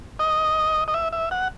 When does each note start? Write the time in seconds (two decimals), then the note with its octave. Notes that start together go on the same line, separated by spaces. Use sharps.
0.19 D#5
0.88 D#5
0.94 E5
1.12 E5
1.31 F#5